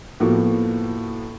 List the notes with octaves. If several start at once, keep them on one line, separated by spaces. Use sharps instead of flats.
A2 F3 A#3 B3 F#4